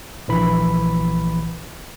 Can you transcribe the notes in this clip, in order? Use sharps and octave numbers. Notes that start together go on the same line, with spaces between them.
A#1 E3 B5